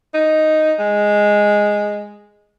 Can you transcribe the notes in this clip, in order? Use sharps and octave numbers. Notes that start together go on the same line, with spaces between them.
D#4
G#3